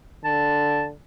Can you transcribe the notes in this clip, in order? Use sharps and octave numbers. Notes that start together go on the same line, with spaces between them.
D3 A5